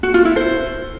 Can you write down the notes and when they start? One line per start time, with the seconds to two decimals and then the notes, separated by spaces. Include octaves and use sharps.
0.03 F#4
0.14 F4
0.25 E4
0.36 C5